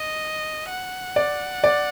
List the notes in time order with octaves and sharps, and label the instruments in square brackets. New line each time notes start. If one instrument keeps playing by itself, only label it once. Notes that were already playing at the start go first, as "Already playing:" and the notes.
Already playing: [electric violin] D#5
F#5
[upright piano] D5
D5